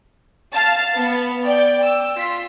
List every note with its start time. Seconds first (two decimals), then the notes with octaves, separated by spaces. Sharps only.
0.54 F5 A5
0.96 B3
1.43 D5 G5
1.83 E6
2.15 F4 B6